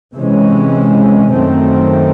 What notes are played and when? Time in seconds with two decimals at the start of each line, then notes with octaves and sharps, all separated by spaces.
0.16 C3 E3 G#3 C#4
1.32 F#2 D#3 A3 C4